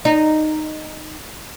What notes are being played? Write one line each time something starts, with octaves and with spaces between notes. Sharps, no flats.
D#4